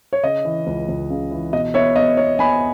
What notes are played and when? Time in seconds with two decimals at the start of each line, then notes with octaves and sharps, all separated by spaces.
0.13 C#5
0.23 C#3 D#5
0.45 E3
0.67 C#2
0.89 C#2
1.10 C#3
1.31 E3
1.53 B2 D#5
1.74 B3 C#5 E5
1.96 B3 D#5
2.17 B3 C#5
2.39 B3 G#5 B5